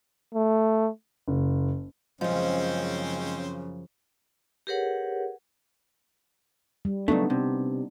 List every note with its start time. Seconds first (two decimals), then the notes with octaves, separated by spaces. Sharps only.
0.34 A3
1.28 F#1
2.21 F#2 C#3 F3 G#3 C4 C#4 D#4 C5
4.67 G4 G#4 A#4 B4 C#5 F#5
6.85 G3
7.08 C#3 F#3 A3 B3 D4 D#4
7.30 C3